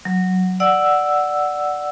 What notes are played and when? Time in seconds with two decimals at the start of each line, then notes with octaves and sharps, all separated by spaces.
0.05 F#3
0.60 D5 F#5 E6